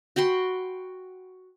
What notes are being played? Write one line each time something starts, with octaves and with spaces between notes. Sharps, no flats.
F#4 G5 B5 C6